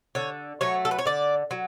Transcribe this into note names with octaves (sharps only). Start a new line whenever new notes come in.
D3 C#5
F#3 A3 C#5
A4
B4
C#5
D3 D5
F#3